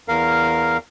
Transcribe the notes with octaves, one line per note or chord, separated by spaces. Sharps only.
E2 A#4 F5